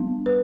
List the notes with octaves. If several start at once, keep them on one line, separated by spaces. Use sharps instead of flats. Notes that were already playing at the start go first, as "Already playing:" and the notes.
Already playing: G3 B3 D4
B4